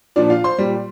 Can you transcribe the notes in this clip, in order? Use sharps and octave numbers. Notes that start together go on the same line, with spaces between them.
A#2 F3 D4 D5
F4 F5
C5 C6
A#2 G3